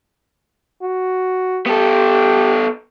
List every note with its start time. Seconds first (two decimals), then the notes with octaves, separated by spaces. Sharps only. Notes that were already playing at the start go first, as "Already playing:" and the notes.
0.82 F#4
1.66 B3 G4 A4